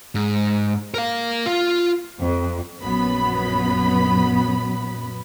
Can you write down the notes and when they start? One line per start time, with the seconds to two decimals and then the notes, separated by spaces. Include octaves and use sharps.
0.15 G#2
0.94 A#4 F5
1.46 F4
2.19 F2
2.82 A#1 F#2 B3 B5